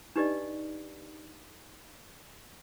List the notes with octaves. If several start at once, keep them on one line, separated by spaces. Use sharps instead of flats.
D4 D#4 G4 B4 D5 D#5